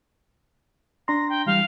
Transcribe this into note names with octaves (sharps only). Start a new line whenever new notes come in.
D4 A#5 C6 A#6
G5
E3 G3 F5